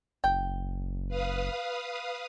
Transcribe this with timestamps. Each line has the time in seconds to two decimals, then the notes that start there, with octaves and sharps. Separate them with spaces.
0.24 F#1 G5
1.09 B4 F5 D#6